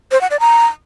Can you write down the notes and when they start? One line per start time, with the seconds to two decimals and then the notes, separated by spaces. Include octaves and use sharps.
0.12 C5
0.21 F#5
0.31 D5
0.40 A#5